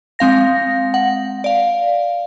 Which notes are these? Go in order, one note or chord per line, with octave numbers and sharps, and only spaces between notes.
G#3 C4 F5 A#6
F#5
D5 F5